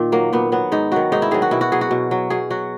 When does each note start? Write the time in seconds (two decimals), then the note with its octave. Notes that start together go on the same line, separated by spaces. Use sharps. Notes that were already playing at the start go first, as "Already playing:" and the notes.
Already playing: A#2 D#3
0.12 F#3 A#3
0.33 A#2 B3
0.52 F#3 B3
0.72 G#2 D#4
0.92 D#3 F#3 F#4
1.12 G#2 D#4
1.22 E4
1.31 D#3 F#3 G#4
1.42 F#4
1.51 B2 E4
1.61 F#4
1.72 F#3 G#4
1.81 F#4
1.91 B2
2.11 F#3
2.30 B2 G#4
2.50 F#3 F#4